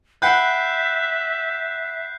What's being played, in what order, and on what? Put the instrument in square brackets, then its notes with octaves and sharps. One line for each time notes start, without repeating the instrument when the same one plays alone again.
[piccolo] E5 [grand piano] F#5 G5 B5 [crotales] F#6 G6 C7